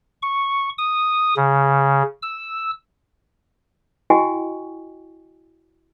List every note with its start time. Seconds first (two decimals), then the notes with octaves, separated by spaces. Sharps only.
0.22 C#6
0.78 D#6
1.37 C#3
2.22 E6
4.10 E4 F#4 D#5 G5 G#5 C#6